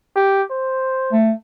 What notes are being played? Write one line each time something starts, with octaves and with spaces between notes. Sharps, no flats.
G4
C5
A3